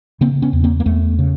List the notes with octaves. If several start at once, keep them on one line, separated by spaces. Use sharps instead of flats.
C#3 A#3 C4
B3 C#4
E2
A#3 C4
A#3
E2 A3 B3
C#3